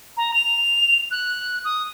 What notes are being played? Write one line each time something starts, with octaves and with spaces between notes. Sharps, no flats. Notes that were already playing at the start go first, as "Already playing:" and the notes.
A#5
F7
F#6
D#6